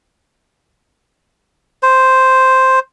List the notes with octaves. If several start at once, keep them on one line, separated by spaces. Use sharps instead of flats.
C5